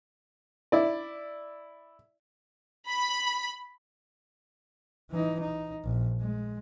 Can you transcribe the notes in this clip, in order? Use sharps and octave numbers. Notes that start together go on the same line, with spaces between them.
E4 D5
B5
E3 D#4
D#4
A#1
G#3